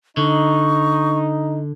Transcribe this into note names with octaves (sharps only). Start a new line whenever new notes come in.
D3 D#4 C#6